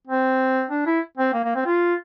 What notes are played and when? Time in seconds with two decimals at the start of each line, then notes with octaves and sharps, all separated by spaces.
0.07 C4
0.70 D4
0.86 E4
1.18 C4
1.34 A#3
1.44 A#3
1.55 C4
1.66 F4